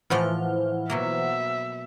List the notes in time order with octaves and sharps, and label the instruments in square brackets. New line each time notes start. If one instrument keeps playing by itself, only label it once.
[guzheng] A2 F3 A4 [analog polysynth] E3 [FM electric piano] C5 F#5 F6
[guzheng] B2 F#3 A#3 [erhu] E5